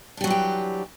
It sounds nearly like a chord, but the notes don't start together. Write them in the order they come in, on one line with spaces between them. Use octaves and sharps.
D4 G3 F#3 E3 G4